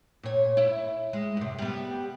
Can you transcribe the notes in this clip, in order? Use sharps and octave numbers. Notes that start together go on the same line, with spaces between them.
A#2 C#5
E4
G#3
F#2 C3
G3 B3